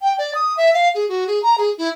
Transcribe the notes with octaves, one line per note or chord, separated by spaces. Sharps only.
G5
D5
D#6
E5
F5
G#4
F#4
G#4
A#5
G#4
E4